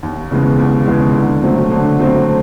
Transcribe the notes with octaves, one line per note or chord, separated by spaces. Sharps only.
D#2
C#3 E3 G#3 B3
D#2
C#3 E3 G#3 B3
D3
F#3 A3 C4
D3
F#3 A3 C4